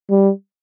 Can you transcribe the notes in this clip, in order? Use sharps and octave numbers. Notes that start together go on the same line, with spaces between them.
G3